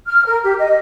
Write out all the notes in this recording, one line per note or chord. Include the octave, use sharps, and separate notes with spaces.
F6
A#4
G4
D#5